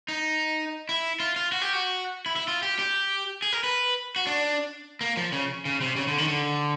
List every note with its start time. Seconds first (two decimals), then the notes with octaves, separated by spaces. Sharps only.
0.08 D#4
0.89 E4
1.20 F4
1.36 F4
1.52 F#4
1.62 G4
1.73 F#4
2.26 E4
2.36 E4
2.48 F4
2.63 G4
2.79 G4
3.42 G#4
3.53 A#4
3.64 B4
4.16 F#4
4.27 D4
5.01 A#3
5.17 F3
5.33 C#3
5.65 C#3
5.81 C3
5.96 C#3
6.07 D3
6.18 D#3
6.28 D3